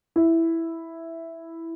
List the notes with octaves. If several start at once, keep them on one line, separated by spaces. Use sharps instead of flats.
E4